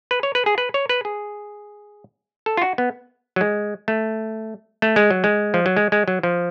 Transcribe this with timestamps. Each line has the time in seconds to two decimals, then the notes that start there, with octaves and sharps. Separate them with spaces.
0.11 B4
0.23 C#5
0.35 B4
0.46 G#4
0.58 B4
0.74 C#5
0.89 B4
1.05 G#4
2.46 A4
2.57 F4
2.62 F#4
2.78 B3
3.36 F#3
3.41 G#3
3.88 A3
4.82 A3
4.96 G#3
5.10 F#3
5.24 G#3
5.54 F3
5.66 F#3
5.76 G#3
5.92 G#3
6.08 F#3
6.23 F3